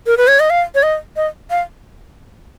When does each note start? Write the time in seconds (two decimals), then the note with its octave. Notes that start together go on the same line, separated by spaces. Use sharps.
0.07 A#4
0.17 B4
0.28 C#5
0.40 D#5
0.50 F5
0.75 C#5
0.83 D#5
1.16 D#5
1.50 F5